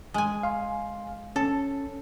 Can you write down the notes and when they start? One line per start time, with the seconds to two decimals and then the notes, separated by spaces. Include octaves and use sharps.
0.14 G#3 G#5
0.43 F5 C6
1.36 C#4 A4